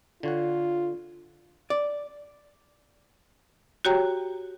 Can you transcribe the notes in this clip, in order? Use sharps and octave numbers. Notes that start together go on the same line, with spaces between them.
D3 F4 C#5 F#5
D5
F#4 G4 C#5 G5 A#5